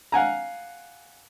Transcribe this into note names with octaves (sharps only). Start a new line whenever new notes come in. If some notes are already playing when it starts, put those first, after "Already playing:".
F5 F#5 G#5 A#5